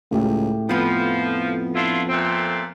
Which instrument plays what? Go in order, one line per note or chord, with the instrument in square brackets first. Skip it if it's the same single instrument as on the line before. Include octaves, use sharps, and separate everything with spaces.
[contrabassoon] C#2 [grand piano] A2 G4
[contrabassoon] F2 [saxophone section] F3 [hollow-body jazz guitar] B3 B4
[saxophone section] D4 E4 F4
A#2 A3 C4